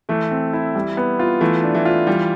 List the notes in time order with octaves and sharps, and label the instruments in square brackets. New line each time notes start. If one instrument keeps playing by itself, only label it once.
[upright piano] E3 [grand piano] A3
[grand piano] C4
E4
G3
B3
F4
[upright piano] E3 [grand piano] A3
[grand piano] D4
[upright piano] E3
[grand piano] F4
[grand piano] E3 [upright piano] G3